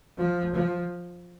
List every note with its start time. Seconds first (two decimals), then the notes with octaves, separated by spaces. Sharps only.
0.18 F3
0.54 F3